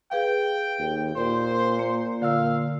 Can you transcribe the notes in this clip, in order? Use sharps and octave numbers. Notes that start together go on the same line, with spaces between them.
G#4 B4 F5 G5
D#2
A#2 C5
A#3
A#2 D3 F5 E6